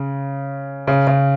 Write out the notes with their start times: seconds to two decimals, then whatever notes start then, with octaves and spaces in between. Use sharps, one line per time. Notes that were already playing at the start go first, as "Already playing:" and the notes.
Already playing: C#3
0.87 C#3
1.07 C#3